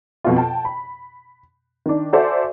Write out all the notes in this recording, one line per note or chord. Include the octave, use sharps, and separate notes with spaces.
F2 B2 F4
G5 A5
B5
D#3 D4
F#4 A4 C5 D5 E5 G#5